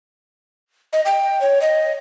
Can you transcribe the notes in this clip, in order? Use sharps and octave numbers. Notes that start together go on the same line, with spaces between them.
D#5
G5
C#5
D#5